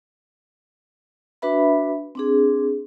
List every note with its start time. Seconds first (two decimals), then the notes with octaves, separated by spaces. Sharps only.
1.42 D4 F#4 B4 E5 B5
2.15 C4 D4 G#4